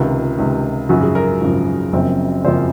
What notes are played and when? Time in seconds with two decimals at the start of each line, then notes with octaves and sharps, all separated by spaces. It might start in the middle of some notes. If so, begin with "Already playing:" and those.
Already playing: C#2 C3 D#3 F4
0.38 C#2 C3 D#3
0.89 G#1 F#2 C#3 F3 F#4
1.02 G#4
1.15 A#4
1.41 G#1 F#2 C#3 F3
1.93 F#1 F#2 C#3 F3 C4
2.44 F#1 F#2 C#3 F3 C4 C5